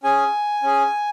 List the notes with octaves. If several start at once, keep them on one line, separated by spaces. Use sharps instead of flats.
C#4 G#4 G#5
C#4 G#4